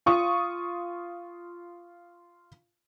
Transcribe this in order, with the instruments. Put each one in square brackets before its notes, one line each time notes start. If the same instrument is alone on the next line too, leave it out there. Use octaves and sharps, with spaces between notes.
[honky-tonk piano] F4 C#6 D#6